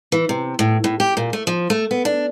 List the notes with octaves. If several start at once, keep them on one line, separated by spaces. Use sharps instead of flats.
E3
C3
A2
A2
G4
A#2
A3
F3
A3
B3
D4